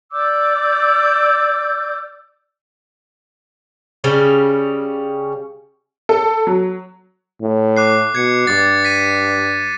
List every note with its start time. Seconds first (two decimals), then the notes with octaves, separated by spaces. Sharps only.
0.12 D5 D6 E6 G6
4.04 C#3 G3 C#4
6.09 A4
6.47 F#3
7.42 A2
7.77 D6 F#6 C7
8.15 B2 G#6 C#7
8.47 G2 D6 A6
8.84 B6 D#7